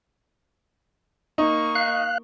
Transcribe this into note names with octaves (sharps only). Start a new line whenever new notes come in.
A#3 D#4 C#6
F5 F#6